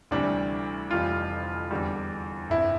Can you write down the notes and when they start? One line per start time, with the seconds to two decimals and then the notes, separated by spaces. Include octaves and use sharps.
0.11 D2 C3 E3 G3 D4
0.91 F1 F2 E3 G3 F4
1.71 E2 D3 G3
2.50 G1 F2 C3 E4